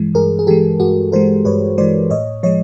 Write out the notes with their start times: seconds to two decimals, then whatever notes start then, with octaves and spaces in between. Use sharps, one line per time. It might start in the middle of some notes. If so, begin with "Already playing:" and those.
Already playing: G2 E3 G#3
0.14 G2 G#4 A#4
0.39 G#4
0.47 E3 G#3 G4 A4
0.80 G2 F#4 G#4
1.12 E3 G#3 A#4 C5
1.45 G2 B4 C#5
1.78 E3 G#3 C5 D5
2.10 A2 C#5 D#5
2.43 F3 G#3 C#5 D#5